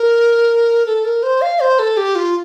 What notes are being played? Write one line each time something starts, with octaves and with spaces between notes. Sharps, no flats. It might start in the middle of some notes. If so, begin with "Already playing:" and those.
Already playing: A#4
A4
A#4
C5
F5
C5
A4
G4
F4